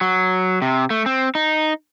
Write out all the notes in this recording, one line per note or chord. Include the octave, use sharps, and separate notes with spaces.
F#3
C3
A3
C4
D#4